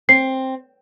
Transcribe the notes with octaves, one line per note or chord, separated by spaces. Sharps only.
C4 C7